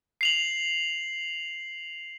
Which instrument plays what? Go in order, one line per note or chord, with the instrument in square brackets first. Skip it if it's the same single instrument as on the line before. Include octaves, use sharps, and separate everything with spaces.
[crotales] C7 F7 F#7